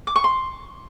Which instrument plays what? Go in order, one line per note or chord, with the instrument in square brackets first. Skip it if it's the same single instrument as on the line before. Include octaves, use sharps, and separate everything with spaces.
[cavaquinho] D6
C#6
C6